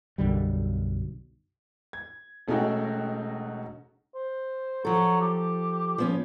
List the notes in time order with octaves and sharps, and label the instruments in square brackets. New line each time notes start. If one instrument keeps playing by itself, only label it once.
[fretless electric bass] B1 F#2 D3 G3
[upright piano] G#6
E1 A3 C#4 D#4 F#4 G5
[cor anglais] C5
[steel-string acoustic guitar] F3 A4 [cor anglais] F#3
[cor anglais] G4
[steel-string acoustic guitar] F3 B3 C#4